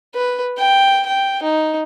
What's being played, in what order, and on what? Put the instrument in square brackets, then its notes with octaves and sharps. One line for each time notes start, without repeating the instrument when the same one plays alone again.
[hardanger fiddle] B4
G5
G5
D#4